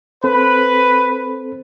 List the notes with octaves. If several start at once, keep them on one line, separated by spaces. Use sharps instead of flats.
C4 A4 B4 C5 B5